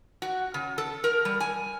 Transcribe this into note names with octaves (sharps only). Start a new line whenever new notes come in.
F#4
C#3
A4
A#4
G3
G#5